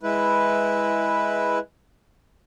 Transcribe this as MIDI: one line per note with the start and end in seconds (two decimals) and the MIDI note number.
0.03 1.59 56
0.03 1.59 64
0.03 1.59 71